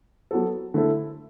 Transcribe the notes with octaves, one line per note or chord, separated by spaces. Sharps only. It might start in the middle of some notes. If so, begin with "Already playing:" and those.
F#3 B3 F#4 A4
D3 A3 E4 A4